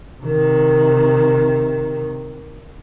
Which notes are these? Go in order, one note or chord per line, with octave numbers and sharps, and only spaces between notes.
C3 D#3